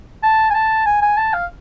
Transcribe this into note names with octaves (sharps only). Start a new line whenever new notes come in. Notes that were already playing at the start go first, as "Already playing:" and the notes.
A5
G#5
A5
G#5
G#5
A5
F5